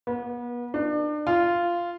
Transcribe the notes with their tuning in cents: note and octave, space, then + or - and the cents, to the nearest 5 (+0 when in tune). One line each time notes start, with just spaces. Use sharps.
B3 -35
D4 +35
F4 -10